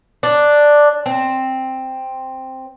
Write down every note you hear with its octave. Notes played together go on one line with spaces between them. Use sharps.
D4
C4